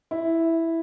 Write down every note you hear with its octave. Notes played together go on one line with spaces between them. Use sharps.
E4